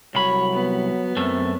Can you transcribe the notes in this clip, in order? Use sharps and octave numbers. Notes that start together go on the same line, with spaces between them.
C2 F#3 C#5 B5
B3
F#2 A3 C4